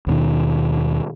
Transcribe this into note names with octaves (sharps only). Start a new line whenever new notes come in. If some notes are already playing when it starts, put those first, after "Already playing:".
D#2 B2 D#3